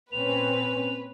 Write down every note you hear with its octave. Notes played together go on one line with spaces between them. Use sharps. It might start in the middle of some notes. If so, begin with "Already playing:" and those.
A#2 C4 C#4 B4 F7